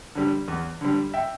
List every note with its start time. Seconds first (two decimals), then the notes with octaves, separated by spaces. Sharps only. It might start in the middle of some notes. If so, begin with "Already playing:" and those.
0.15 D3 G3
0.48 E2
0.81 D3 G3
1.14 E5 G5